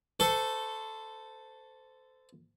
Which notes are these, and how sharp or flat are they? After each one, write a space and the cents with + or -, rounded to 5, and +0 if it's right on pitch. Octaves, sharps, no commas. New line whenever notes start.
A4 +0 C5 -25 C#6 +0